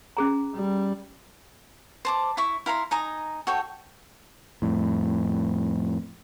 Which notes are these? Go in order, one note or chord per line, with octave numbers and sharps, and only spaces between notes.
C#4 G#4 A#5
G3
C5 A5 D6
E4 E5 C#6
E4 F5 A#5 C6
D#4 G#5 A#5 D#6
F#4 A4 C#5 G5
F2 A2